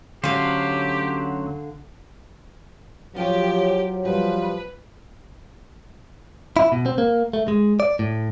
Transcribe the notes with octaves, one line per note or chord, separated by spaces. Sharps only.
D2 D3 F#3 C#4 G4 C5 C#5 F5
F3 F#3 F4 G4 C5 C#5
F3 G3 B4
E4
B2
C4
A#3
A3
G#3
D5
A2